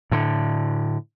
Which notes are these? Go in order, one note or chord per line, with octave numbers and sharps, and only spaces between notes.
A2 D3